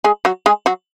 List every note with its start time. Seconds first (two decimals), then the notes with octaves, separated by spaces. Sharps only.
0.04 G#3 G#4
0.25 F#3 F#4
0.46 G#3 G#4
0.66 F#3 F#4